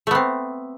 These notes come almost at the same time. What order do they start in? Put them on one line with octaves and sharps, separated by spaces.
A3 B3 C4